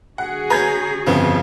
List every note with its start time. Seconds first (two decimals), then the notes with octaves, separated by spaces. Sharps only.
0.18 D3 F#4 G#4 F#5
0.50 C#4 B4 A#5 G6 G#6
1.07 G1 F2 C#3 F3 B3